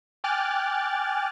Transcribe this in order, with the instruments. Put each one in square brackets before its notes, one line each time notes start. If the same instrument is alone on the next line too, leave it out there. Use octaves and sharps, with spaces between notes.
[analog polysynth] G5 G#5 D6 F6 F#6 A6